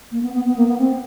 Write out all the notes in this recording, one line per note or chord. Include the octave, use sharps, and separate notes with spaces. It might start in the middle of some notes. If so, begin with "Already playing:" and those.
A#3
B3
B3
B3
A#3
B3
C4